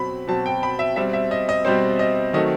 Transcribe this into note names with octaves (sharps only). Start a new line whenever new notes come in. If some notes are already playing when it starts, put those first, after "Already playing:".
Already playing: B2 F#3 C4 B5
B2 F#3 C4 A5
G5
B5
E5
B2 G3 C4 E5
E5
D#5
D#5
B2 G3 C4 C5
D#5
D#3 F#3 A3 C4 D#5